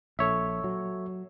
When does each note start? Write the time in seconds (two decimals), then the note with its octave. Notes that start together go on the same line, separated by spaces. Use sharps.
0.19 A#1 A4 C#5 E5
0.64 F#3